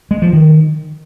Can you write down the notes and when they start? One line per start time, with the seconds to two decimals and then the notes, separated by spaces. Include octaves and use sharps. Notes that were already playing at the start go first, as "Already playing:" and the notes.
0.11 G#3
0.22 F3
0.33 D#3